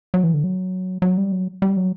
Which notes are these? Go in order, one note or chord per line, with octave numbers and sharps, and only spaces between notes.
F#3
E3
D3
F#3
F#3
G3
F#3
G3
F#3